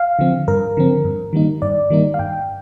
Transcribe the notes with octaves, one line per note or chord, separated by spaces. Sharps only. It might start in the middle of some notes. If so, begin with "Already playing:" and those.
Already playing: F5
D3 F3 C4
G2 A#4
D3 F3 C4
G2
D#3 G3 A#3 D#4
G2 D5
D#3 G3 A#3 D#4
F5
G2 G5